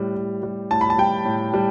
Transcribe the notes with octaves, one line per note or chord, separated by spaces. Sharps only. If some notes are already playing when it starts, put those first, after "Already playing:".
Already playing: A2 G3
A2
G3
A2 A5
B5
A5
G3 G5
A2
G3